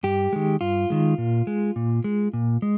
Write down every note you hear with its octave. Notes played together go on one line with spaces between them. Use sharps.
G2 G4
D#3 G#3
G2 F4
D#3 G#3
A#2
G#3
A#2
G#3
A#2
G#3